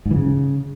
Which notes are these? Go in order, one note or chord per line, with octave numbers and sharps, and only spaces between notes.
G#2
E3
C#3